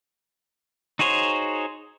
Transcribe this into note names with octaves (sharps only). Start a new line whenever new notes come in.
D#4 F#4 G#4 C5 C#5